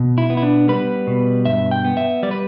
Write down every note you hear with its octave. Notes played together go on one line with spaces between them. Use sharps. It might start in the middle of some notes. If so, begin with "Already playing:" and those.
Already playing: B2
E4
B3
E4
D4
G3 B4
B2
G2 E5
G5
B3
E5
G3 D5
B4